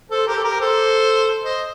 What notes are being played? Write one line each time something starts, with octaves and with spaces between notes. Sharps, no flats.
A4 C5
G4 A#4
A4
G4 A#4
A4 C5
C5 D#5